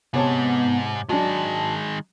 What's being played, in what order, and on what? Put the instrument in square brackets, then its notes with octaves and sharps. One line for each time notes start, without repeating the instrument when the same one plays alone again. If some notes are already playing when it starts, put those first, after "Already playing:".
[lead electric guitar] G#2 [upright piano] C3 C#5 A5 [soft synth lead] B3
[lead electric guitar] D#3 G#3 [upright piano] F#3 D4 [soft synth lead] A5